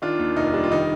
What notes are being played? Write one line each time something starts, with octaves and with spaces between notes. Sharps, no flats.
D#3 D4 F4
D#2
F1 D#4
G3 D4
F4
D#3 D#4